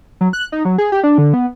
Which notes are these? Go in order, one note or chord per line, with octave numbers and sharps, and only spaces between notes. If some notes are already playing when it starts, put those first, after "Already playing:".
F#3
F#6
D#4
F#3
G#4
G4
D4
D3
B3